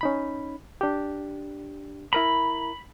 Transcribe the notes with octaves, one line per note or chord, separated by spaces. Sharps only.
C#4 D#4 B5
D4 G4
E4 A#4 A#5 B5